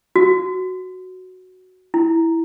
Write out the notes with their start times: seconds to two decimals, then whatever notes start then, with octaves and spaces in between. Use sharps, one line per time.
0.16 F#4
1.94 E4